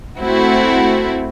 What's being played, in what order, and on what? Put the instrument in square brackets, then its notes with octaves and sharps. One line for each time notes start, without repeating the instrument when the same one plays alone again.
[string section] A3 C4 E4 F#4